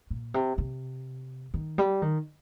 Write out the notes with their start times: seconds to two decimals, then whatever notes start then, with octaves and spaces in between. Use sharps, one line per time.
0.10 A#2
0.34 C3
0.58 C3
1.54 D#3
1.78 G3
2.02 D#3